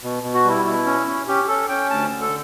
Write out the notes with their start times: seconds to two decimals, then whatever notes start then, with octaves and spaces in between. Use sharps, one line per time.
0.03 B2
0.23 B2
0.34 F#4
0.44 G3 E4
0.65 B2 E4
0.86 C#4
1.07 C#4
1.27 C#4 G4
1.48 C#4 A4
1.69 C#4 G5
1.90 D2 A5
2.11 D3
2.21 A4